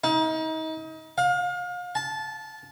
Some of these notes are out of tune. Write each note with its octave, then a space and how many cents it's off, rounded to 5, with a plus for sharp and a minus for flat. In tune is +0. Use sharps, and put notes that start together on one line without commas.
D#4 +35
F5 +35
A5 -15